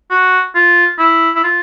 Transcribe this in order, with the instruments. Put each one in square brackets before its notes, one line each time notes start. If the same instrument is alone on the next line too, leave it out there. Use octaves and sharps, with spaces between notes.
[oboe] F#4
F4
E4
E4
F4